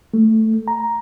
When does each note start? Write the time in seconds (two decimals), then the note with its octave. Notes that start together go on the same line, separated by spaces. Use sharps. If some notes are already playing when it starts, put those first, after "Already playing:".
0.14 A3
0.68 A#5